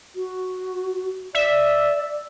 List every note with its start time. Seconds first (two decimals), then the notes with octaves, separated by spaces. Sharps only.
0.16 F#4
1.35 D5 E5